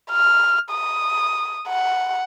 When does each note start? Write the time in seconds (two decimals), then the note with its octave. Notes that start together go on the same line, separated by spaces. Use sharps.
0.11 F6
0.71 D#6
1.68 F#5